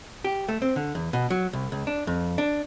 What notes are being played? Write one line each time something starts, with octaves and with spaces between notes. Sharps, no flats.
G4
A3
C4
D3
E2
B2
F#3
C2
C#2
D4
F2
D4